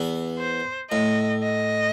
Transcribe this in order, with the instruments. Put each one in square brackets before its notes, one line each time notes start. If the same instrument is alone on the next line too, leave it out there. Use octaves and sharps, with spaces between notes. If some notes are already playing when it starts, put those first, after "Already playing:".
Already playing: [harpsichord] E2 E3
[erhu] C5
[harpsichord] A2 [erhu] D#5
[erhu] D#5